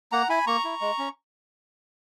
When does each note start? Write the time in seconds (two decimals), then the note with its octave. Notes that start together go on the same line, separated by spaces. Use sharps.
0.12 A#3 F#5 A#5
0.29 E4 G#5 B5
0.47 A#3 A#5 C#6
0.65 E4
0.81 G#3
0.98 C#4